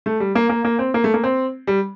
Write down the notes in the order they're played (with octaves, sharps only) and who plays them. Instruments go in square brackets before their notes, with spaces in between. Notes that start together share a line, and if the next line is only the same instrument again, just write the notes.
[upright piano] A3
G3
A#3
A#3
A#3
C4
A#3
A3
A#3
C4
G3